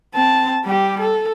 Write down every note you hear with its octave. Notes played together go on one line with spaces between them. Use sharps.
C4 A5
G3 G4
A4